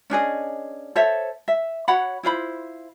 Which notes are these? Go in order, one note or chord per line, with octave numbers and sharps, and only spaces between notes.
C#4 D4 G#4 D#5
A4 C5 C#5 E5
E5
F#4 C#5 F#5 B5
E4 F4 C5 B5